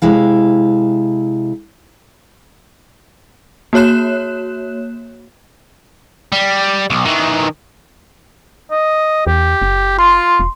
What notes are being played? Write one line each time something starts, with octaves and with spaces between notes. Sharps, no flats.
C3 G#3 E4 F5
A#3 F#4 C#5 F#6 E7
G3
B1
D#3 E3
D#5
E2 G4
F#1
F4 C6
E1